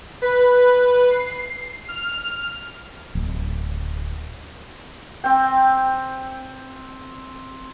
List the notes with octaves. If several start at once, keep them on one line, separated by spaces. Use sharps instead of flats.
B4
C7
F6
D1
C4 G5